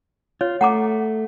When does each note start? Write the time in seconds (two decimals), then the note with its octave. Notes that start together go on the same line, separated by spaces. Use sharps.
0.41 F4 C#5
0.61 A3 F#5 A#5 D6